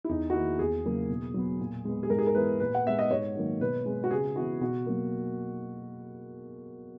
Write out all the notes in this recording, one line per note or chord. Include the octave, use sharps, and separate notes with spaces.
E4
E2 D#4
F#4
D#3 A#3 E4
E2 G#4
C#3 F#3 A#3
B2
F#3 B3
A#2
G#3 B3
G#4
G#2 A#4
G#4
A#4
E3 G#3 B3 B4
A#2 B4
F#5
G#3 B3 E5
D#5
G#2 C#5
D#3 F#3 A#3
B2 B4
G#3 B3
F#4
C#3 G#4
E3 B3 F#4
B2 F#4
F#3 A#3